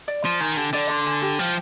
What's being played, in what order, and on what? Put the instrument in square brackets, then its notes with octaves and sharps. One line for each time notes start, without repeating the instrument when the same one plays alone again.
[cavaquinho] D5
[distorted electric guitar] F3 [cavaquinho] C6
[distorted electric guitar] D#3 [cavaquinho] G#5
[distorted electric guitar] D3 [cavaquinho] G4
[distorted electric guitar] D3 [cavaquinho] D5
[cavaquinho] C6
G#5
G4
[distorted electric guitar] F3 [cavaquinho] G5